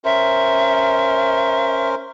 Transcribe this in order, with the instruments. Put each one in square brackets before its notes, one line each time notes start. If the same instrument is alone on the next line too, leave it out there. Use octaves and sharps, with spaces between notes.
[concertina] C#4 A#4 C5 [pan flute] E5